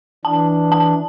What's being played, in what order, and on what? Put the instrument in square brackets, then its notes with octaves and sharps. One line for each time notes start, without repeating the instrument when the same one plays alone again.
[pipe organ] E3 D4 [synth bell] A5
[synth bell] A5